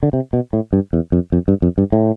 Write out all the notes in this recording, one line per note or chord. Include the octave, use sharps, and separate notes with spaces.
D3
C3
B2
A2
G2
E2
F2
F2
G2
F2
G2
A2